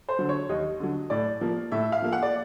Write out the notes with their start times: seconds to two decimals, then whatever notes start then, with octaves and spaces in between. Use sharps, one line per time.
0.09 C5
0.19 D3 F#3
0.29 C#5
0.49 D#2 D#5
0.80 D3 F#3
1.10 A2 D5
1.41 F3 A#3
1.72 A2 E5
1.92 F5
2.02 F3 A#3
2.13 F#5
2.22 D5